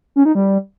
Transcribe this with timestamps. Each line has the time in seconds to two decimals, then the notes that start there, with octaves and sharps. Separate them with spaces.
0.16 C#4
0.25 D#4
0.35 G3